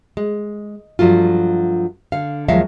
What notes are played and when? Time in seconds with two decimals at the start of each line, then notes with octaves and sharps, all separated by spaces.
0.17 G#3
0.99 G2 F3 F#3 A3 F4
2.12 D3 F5
2.48 D#2 F3 F#3 G#3 E5 F5